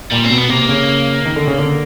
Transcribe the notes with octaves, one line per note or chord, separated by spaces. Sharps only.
A#2 G3
C4
B2
B3
C3 A#3
C#3
D#3
D3
C#3
D3